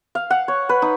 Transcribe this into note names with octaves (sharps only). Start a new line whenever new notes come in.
F5
F#5
C#5
B4
D#4